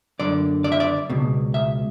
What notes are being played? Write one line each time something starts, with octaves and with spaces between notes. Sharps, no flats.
F#2 D3 D5
D5
E5
D5
C#2 B2
E5